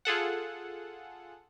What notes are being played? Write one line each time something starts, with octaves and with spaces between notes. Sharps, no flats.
F4 G#4 A4 F#5